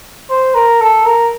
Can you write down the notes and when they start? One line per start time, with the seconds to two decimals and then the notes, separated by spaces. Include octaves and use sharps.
0.30 C5
0.55 A#4
0.81 A4
1.06 A#4